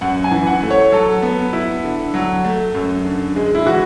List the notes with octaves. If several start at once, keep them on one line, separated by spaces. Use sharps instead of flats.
F#2 F#5
G#5
E3
F#5
A3
C#5
F#3 A4
B3
E4
D3
F#3
A3
F#2
D3
G#3
E4
E3 F#4